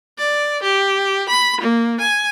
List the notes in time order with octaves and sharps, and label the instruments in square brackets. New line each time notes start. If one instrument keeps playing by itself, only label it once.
[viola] D5
G4
B5
A#3
G#5